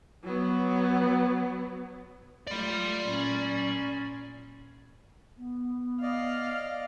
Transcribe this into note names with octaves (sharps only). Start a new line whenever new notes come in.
F#3 B3
A3 F4 D5 B5
A#2 C#4
B3
D5 D#5 F5